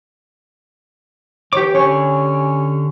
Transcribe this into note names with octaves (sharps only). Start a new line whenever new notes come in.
E3 G4 C#5 D6
D3 C#4 G4 C#5 G#5